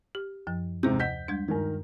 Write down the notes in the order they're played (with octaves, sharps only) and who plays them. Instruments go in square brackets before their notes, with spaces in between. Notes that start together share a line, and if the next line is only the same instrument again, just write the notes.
[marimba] G4
F#2 F3
[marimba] D#2 C5 G6 [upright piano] G#2 C3
[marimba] D#5 F#5 [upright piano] G6 B6
[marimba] G3 G#3 D4
[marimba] G2 G#3 [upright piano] D#3 A#4